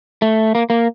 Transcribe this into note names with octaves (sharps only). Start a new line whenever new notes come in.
A3
A#3
A#3